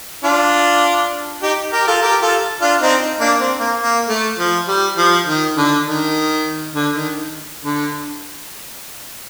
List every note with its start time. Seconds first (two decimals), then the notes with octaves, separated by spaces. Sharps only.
0.24 D4 F4
1.43 D#4 G4
1.72 G4 A#4
1.87 F4 A4
2.02 G4 A#4
2.22 F4 A4
2.61 D4 F4
2.81 C4 D#4
3.20 A#3 D4
3.40 C4
3.60 A#3
3.79 A#3
4.09 A3
4.39 F3
4.68 G3
4.98 F3
5.27 D#3
5.57 D3
5.86 D#3
6.75 D3
6.95 D#3
7.64 D3